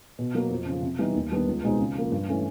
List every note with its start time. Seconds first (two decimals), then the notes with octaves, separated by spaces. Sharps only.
0.19 B2
0.35 F#3 A#3
0.50 F2
0.66 C#3 F3
0.82 C3
0.99 E3 G3 B3 D#4
1.15 D#2
1.32 D#3 G3 B3 D4
1.47 C#2
1.64 B2 G#3 C4 D#4
1.79 C#3
1.95 F3 A#3
2.12 G2
2.28 E3 A3 C#4